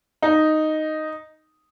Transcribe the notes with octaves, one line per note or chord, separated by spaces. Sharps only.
D#4